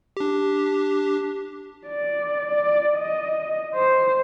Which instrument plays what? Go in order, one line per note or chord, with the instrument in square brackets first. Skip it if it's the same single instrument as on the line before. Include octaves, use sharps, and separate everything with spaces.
[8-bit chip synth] D4 G4
[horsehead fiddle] D5
D5
D#5
C5